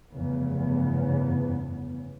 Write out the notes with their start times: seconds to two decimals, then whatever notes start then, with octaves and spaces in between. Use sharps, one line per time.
0.14 F1 E2 G2 C#3 B3